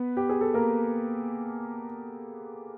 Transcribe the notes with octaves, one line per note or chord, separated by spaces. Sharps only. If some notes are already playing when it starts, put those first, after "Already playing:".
Already playing: B3 B4
G4
G#4
A4
A#3 A#4